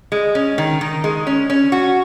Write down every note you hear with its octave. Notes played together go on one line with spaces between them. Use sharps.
G#3
C#4
D#3
D#3
G#3
C#4
C#4
F#4